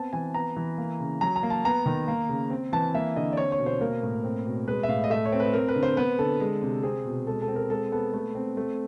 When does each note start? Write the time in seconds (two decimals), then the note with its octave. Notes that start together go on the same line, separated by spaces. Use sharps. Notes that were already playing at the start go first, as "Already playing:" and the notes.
Already playing: B3 C4 A5
0.13 E3 G#5
0.34 B3 A#5
0.56 E3
0.78 A#3
1.00 C#3
1.21 F#3 A#5
1.36 A#5
1.43 A#3
1.50 A5
1.65 B3 A#5
1.86 D#3
2.08 A#3
2.29 C#3
2.50 C4
2.73 E3 A5
2.94 A#3 E5
3.16 D3 D#5
3.32 D5
3.37 C4 C#5
3.52 C#5
3.59 B2
3.66 C5
3.81 A#3 A#4
4.03 A2
4.24 C4
4.45 B2
4.68 G#3 B4
4.83 E5
4.88 A2 F5
5.04 D#5
5.10 A3 E5
5.26 C#5
5.32 C4
5.40 B4
5.53 C4 A#4
5.69 B4
5.76 D3
5.83 C5
5.97 B3 B4
6.19 D3 A4
6.40 G#3
6.62 C3
6.83 C4 G#4
7.05 B2
7.27 G#3 A4
7.42 A4
7.48 C4
7.56 A#4
7.70 G#3 A4
7.92 B3 A4
8.14 A3
8.35 C4
8.57 A3